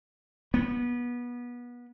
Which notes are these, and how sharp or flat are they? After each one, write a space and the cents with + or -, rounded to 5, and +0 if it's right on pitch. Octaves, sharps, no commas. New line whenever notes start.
B3 -25